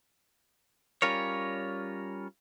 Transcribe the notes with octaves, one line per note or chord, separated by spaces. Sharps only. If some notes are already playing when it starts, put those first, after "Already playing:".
G3 C#4 F4 A#4 C#5